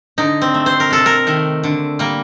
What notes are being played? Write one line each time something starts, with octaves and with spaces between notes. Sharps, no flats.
D3 D#4
C4
A3
C5
A#4
C3 A4
A#4
D#3 A3
D3
G3 A#3